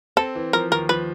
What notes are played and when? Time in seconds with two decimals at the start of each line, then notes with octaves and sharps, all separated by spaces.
0.17 C4 A4
0.35 E3
0.53 F3 A#4
0.71 D#2 A#4
0.89 F3 B4